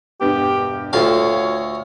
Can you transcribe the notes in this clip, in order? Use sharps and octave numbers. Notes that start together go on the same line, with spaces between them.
E1 G2 B3 G4
D2 F4 F#4 A4 C#5 F5 G5 A5